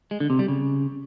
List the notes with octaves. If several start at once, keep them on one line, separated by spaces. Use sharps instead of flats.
G#3
D3
C3
G3
C#3